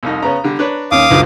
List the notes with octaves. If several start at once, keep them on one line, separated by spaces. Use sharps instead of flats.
C2 F2 D#4
C#3 B3 C#4 A#5
D3 G3
D4 B4 C#5
D#2 C#4 F5 D6 D#6
F#1 C#2 G#2 D3 F#3